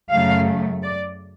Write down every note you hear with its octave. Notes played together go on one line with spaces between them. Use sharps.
F#2 C#3 F#3 A3 F5
D5